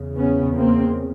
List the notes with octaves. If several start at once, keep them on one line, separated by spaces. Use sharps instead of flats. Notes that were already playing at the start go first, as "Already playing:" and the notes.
Already playing: E2 C#3
B3 C#4
A#3 C4